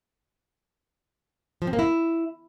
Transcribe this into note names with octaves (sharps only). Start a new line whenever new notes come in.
F3
C4
A#3
E4